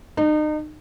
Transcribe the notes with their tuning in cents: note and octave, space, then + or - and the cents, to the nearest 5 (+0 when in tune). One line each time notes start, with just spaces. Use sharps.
D#4 -35